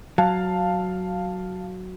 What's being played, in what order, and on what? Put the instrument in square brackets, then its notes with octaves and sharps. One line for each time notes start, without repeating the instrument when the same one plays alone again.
[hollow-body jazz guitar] F#3 [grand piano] F5 A5